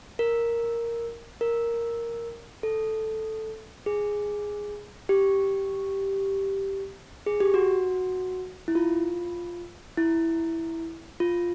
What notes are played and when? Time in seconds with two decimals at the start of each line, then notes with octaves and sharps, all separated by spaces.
0.19 A#4
1.41 A#4
2.63 A4
3.86 G#4
5.09 G4
7.26 G#4
7.40 G4
7.54 F#4
8.68 E4
8.75 F4
9.97 E4
11.20 F4